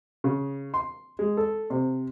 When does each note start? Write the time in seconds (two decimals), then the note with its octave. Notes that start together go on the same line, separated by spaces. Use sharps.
0.24 C#3
0.74 C6
1.19 G#3
1.37 A4
1.70 C3